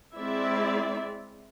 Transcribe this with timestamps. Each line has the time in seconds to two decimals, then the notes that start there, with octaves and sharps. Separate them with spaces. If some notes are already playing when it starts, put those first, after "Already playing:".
0.17 G#3 C4 E4 D5 E5